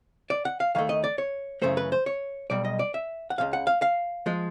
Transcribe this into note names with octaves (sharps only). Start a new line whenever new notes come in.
D5
F#5
F5
D#2 D#3 A3 F5
D#5
D5
C#5
F#2 C#3 E3 A3 C5
B4
C5
C#5
B1 B2 G3 D5
D#5
D5
E5
F#5
C#2 C#3 F5
F#5
F5
F5
F3 G#3